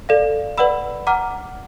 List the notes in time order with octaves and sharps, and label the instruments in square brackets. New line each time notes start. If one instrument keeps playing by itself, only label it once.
[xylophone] A4 D5 F5
B4 D5 F#5 B5 E6
F#5 A#5 D6 F6